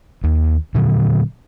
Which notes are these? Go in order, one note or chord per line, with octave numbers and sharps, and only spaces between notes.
D#2
A#2 D3 F#3